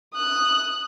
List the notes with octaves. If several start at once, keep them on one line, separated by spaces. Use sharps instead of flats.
D#6 F#6